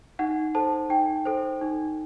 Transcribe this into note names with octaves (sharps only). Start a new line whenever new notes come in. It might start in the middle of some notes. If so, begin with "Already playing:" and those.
D#4 F#5
A4 C5 A5
D#4 G5
A4 C5
D#4